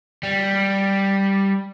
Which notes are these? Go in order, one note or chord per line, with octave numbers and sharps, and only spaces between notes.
G3